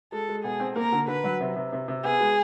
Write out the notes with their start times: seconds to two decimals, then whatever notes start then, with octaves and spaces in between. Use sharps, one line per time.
0.12 G#3 A4
0.29 G#3
0.44 B2 G#4
0.60 C4
0.76 A#3 A#4
0.92 D3
1.08 D3 B4
1.24 F#3
1.41 C3
1.56 C3
1.73 C3
1.88 C3
2.04 B3 G#4
2.20 G#3